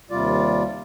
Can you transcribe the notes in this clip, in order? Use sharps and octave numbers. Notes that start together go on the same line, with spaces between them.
D#2 C3 G3 F4 D5